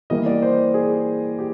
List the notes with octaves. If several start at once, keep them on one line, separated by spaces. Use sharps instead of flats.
E3 G3 A#3 D#5
D5
C5
G#4
G4